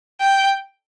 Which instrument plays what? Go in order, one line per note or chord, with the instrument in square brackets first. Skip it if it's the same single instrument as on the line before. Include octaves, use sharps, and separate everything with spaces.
[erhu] G5